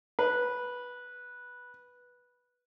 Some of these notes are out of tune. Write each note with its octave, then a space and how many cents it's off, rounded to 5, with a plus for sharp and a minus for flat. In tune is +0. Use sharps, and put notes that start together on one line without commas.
B4 -10